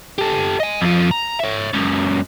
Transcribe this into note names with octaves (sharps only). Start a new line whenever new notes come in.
G4 A4
D#5 G#5
F2 F3
A#5
C#5 E5
C#2 F#2